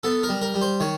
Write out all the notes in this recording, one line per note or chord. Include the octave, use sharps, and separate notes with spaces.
B3 A4
A#4
G3
A#4
G3
C5
D#3 C#5